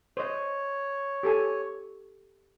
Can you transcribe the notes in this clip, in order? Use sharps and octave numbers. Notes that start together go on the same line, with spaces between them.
C5 C#5 D#5
G4 A4 G#5